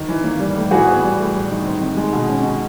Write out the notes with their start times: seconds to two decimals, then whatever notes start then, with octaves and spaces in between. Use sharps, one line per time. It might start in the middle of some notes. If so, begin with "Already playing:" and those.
Already playing: D#3
0.08 E3
0.24 A#3
0.39 G3
0.55 A2
0.71 E3 F#4 G#4
0.87 B3
1.03 G3
1.18 A2
1.34 G3
1.50 D#3
1.66 C4
1.81 D#3
1.97 G#3
2.12 B2
2.29 C#4
2.44 B2